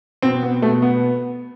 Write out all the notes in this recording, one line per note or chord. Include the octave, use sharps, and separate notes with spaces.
B2 C4
B3
B2 A3
B3